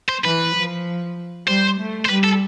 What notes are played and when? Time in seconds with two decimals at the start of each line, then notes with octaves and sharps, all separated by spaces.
0.09 C5
0.25 E3 B4
0.55 F3
1.47 G3 C5
1.79 A3
2.05 C5
2.08 G3 B4
2.24 A4